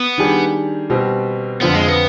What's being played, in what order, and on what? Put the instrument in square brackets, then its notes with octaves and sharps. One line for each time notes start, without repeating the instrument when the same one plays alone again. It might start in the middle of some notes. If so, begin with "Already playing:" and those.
Already playing: [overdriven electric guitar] B3
[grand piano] D#3 G3 D4 G#4
B2 G3 C4
[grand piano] F2 D3 F3 C4 F4 [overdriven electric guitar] B3
[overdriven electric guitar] G#3
B3